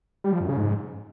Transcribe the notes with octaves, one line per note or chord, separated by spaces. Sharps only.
G3
F3
F#2
C#3
G#2